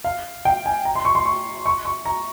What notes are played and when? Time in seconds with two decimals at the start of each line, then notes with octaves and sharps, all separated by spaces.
0.04 F5
0.45 G5
0.66 G#5
0.85 A#5
0.95 C6
1.05 C#6
1.15 C6
1.25 C#6
1.66 C#6
1.85 C#6
2.06 A#5